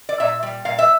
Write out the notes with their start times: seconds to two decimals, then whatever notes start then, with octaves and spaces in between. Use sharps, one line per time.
0.09 D5
0.20 A#2 E5
0.43 G3
0.65 A#2 F5
0.79 E5